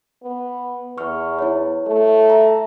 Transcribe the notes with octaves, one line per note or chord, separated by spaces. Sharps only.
B3
E2 C#6 F6
E4 C#5
A3
E5 A#5